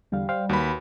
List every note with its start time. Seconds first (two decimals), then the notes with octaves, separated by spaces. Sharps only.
0.12 E2 D3 G3 F5
0.29 C5 F5 G5
0.49 D#2 F#4 B4 B5